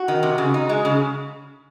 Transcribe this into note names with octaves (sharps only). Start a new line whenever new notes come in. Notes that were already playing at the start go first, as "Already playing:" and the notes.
Already playing: F#4
D#3
C3
C#3
D#4
G#3
C#3